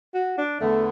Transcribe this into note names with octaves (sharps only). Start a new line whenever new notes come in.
F#4
D4
E2 D3 A3 B3